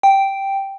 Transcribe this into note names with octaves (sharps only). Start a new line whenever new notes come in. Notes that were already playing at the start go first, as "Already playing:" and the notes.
G5